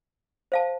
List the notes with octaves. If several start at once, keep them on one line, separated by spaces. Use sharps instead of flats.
C5 F5 A5